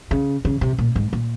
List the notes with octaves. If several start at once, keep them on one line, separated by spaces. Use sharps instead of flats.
C#3
C#3
C3
A#2
G#2
A#2